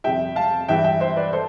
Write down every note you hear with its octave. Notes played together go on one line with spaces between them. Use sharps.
F2 C3 G3 E5 G5
F5 A5
G2 E3 G3 E5 G5
E5 G5
C5 E5
B4 D5
A4 C5